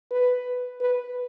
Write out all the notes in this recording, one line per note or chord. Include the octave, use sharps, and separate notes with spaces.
B4
B4